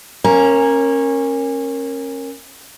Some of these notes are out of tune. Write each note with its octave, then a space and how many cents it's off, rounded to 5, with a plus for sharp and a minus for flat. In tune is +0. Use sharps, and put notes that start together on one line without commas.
A#3 +0 C#4 -25 A#5 +0